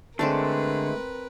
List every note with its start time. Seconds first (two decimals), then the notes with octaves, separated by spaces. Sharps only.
0.19 D3 G#3 A3 C4 A#4 B4 D5 A5